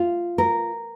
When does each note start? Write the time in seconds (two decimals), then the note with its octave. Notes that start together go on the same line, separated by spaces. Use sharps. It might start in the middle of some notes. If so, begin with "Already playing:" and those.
Already playing: F4
0.38 A#4